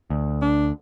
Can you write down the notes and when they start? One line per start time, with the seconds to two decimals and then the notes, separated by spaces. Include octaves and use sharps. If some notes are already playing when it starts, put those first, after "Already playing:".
0.10 D2
0.42 D4